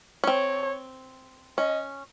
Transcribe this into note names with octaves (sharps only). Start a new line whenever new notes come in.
C#4
C4 C#5
C#4 D#5